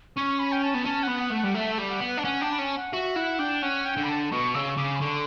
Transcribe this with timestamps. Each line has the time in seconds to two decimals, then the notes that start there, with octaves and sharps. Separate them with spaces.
0.16 C#4 C#6
0.39 B5
0.52 G5
0.63 A5
0.74 B3
0.86 C#4 A5
1.03 F#5
1.09 B3
1.20 F#5
1.31 A3
1.38 F#5
1.44 G3
1.55 A3 E5
1.79 G3
1.90 F#5
2.01 B3
2.07 F#5
2.17 D4
2.24 C#4 F#5
2.41 D4 G5
2.52 B5
2.59 C#4 A5
2.76 F#5
2.93 F#4 E5
3.16 E4 F#5
3.39 D4 G5
3.62 C#4 F#5
3.85 G5
3.97 D3
4.04 B5
4.09 A5
4.31 B2 C#6
4.55 C#3 E6
4.71 C#6
4.77 C#3 D6
4.96 B5
5.01 D3 C#6